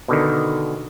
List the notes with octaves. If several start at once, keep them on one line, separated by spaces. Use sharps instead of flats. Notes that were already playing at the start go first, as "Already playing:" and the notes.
B2 D3 D#3